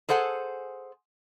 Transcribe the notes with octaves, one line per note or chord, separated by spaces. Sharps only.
G#4 A4 C5 F#5 G#5